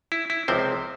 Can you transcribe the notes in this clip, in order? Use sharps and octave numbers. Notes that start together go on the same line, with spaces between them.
E4
E4
C#2 C3 F3 C4 C5